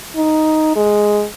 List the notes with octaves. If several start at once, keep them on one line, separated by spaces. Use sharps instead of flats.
D#4
G#3